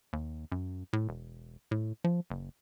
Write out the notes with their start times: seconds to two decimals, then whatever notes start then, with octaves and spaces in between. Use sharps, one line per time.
0.13 D#2
0.52 F#2
0.93 A2
1.09 E1
1.71 A2
2.04 F3
2.30 F#1